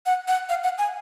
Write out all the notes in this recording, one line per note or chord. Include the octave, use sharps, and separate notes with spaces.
F#5
F#5
F5
F#5
G#5